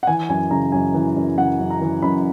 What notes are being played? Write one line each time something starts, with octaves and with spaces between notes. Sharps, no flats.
F#5
E3 G#5
F#2 G#5
C#3 A#5
F#2 G#5
E3
F#2
C#3 F#5
F#2
A#5
E3
F#2 B5